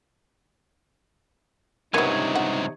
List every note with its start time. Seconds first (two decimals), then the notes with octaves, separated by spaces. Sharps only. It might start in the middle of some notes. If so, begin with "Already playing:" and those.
1.94 C#2 G2 C3 A#3 B3 D#4 C#5 G#5
2.35 F#5